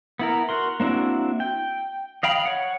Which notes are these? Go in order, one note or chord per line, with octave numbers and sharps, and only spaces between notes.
B3 E4 A#4
F#4 A#4 C6
A#3 C4 D4 E4 F#4
G5
D#5 F5 G5 B5
C#5 F#5